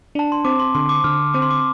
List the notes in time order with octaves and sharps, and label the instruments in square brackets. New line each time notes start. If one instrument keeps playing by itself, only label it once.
[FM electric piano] D4 [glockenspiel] A5
[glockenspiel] C6
[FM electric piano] C4 [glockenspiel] D6
[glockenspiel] C6
[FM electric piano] D3 [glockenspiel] C6
[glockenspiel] D6
[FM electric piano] D3 [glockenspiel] F6
[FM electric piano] C4 [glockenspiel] D6
[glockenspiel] C6
D6